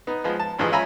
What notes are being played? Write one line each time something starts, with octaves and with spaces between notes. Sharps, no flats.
B3 D#4
F3 G#3 B3
A5
G#1 G2 E3 F3 G#3 D#5
C#4 F4 E5 G#5 A#5 B5